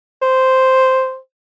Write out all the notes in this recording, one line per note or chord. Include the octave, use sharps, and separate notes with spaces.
C5